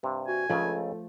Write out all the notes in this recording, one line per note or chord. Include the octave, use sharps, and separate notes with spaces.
G2 C3
F#4 G#5
C#2 C#3 F3 A3 A4